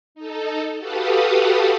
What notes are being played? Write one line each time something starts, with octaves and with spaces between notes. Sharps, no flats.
D#4 A4
F#4 G4 A4 B4 F5 D#6